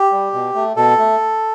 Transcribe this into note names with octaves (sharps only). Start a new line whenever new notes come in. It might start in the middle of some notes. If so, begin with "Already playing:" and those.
Already playing: G4
G3
B2
A3
B2 A4
A3